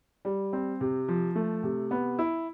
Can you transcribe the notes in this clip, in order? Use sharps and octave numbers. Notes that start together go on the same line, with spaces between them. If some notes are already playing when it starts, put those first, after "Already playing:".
G3
C4
C3
F3
A3
C3
B3
E4